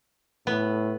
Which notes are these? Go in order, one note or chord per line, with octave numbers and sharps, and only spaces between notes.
A2 B3